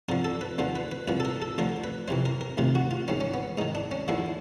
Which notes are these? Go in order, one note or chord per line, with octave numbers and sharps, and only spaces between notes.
F2 D3 F3 A#4
A4
B4
D#2 D3 F3 C5
B4
B4
C2 A#2 F3 B4
A4
A#4
A4
D2 D3 F3 A#4
B4
F2 C3 E3 C5
A#4
A#4
D2 C3 D#3 F4
F#4
F4
G#2 D#3 C#4
C#4
B3
G#2 D#3 D#4
D4
C#4
D#2 D3 F3 E4